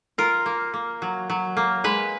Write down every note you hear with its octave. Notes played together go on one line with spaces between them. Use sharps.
F4 A#4
A#3
A#3
F#3
F#3
A#3
G#3 B4